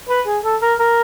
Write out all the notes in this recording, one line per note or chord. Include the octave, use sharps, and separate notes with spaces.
B4
G#4
A4
A#4
A#4